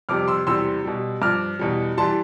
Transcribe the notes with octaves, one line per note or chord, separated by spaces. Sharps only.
F2 C3 G3 D6 F6
C6 E6
E2 C3 G3 C6 E6
B2 G3
G2 F3 D6 F6
E2 B2 G3
E3 G3 A5 C6